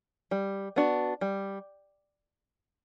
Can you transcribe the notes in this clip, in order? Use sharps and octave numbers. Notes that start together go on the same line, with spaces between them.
G3
B3 D4 F#4
G3